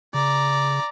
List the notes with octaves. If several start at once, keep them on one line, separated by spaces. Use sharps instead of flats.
C#3 D5 A#5